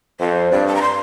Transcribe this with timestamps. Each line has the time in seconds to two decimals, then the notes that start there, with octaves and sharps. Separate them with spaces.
0.20 F2 C5
0.51 G2 D5
0.67 A5
0.75 A#5
0.82 C6